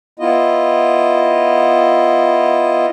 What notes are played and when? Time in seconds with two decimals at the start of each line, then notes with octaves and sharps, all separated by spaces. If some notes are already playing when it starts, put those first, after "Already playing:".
0.20 B3 E4 F4 D#5